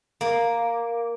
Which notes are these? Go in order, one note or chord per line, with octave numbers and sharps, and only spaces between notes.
A#3